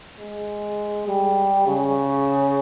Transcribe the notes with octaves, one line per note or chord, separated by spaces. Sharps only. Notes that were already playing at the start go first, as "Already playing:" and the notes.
G#3
G3
C#3